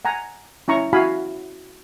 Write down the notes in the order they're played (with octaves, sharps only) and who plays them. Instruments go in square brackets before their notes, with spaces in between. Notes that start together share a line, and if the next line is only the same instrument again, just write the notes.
[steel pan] F#5 G#5 A#5
C#4 E4 A#5 C#6
E4 F#4 F5 G#5 B5